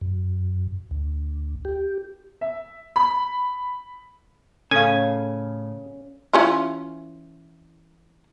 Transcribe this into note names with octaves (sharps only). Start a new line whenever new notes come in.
F#2
D2
G4
E5
B5
A2 C#3 C#4 A4 F5 G#5
E3 C#4 F4